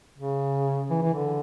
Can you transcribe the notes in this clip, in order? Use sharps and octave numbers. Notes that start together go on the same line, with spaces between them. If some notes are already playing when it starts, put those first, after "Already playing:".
C#3
E3
E3
D3